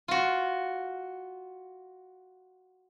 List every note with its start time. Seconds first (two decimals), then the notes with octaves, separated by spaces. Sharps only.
0.08 F4 F#4